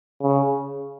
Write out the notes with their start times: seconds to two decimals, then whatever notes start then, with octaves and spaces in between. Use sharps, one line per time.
0.22 C#3